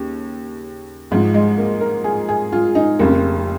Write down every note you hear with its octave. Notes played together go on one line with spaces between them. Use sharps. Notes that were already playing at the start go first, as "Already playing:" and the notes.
Already playing: D#2 C#3
G#1 G#2 F3
G#3
A#3
A#4
G#4
G#4
F4
D#4
F1 F2 C#3 A#3